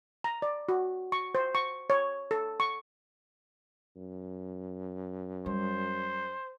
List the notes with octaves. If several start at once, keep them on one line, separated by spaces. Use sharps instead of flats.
A#5
D5
F#4
C#6
C5
C#6
C#5
A4
C#6
F#2
G3 C5